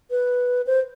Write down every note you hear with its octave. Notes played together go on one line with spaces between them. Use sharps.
B4
C5